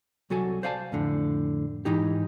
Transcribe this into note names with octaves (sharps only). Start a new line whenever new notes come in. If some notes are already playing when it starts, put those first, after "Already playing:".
C2 F#3 F#4 A4 G#5
C5 D5 F5 G#5 A5
F2 A2 D3
G#2 E3 D#4 G4